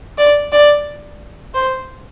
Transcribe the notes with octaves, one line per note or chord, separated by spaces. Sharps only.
D5
D5
C5